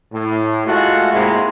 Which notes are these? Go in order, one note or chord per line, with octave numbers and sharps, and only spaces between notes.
A2
G#3 A3 F4 F#4
G#2 C3 G#3 A#3 E4